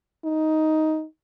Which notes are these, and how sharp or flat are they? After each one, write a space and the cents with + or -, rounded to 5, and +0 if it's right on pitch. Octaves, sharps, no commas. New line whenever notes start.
D#4 +10